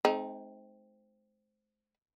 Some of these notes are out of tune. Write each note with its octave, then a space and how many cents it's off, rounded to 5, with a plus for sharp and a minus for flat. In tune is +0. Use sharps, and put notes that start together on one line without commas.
G#3 +45 C4 +0 D#4 +0